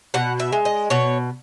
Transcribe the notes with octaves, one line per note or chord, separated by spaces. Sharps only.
B2 F#5
E5
G#3
D#5
B2 C#5